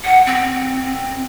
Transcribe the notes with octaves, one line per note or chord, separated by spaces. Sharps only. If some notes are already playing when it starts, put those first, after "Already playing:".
F#5
C4